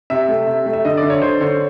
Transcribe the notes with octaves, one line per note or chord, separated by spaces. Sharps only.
C3 E5
A3
C3
A3
E5
D3 D#5
D5
D3
C#5
D3 C5
D3 C#5